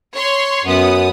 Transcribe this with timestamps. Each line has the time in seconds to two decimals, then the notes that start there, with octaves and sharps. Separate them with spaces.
0.13 C#5 C6
0.64 F#2 B3 D#6